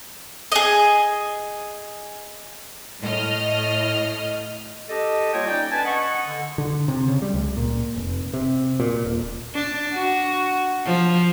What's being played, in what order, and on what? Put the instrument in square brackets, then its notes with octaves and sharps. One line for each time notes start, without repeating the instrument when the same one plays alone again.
[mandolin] G#4 D#5
[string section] A2 D#5 F6
[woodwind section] D4 G4 A4 D#5
G3 A#3 F4 C#5 D#5 G5
C#4 D#4 D5 G5
C#4 D4 B4 G#5 A5
D#5 F#5 C#6
D3
[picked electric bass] D3
C3
C#3
G3
C#2
A#2
F1
C3
A#2
D#1
[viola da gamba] D4
F#4
F3